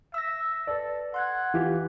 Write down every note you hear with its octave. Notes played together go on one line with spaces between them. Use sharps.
E5 E6 A#6
A4 B4 D5
F#5 C6 F#6 G#6
E3 F4 G4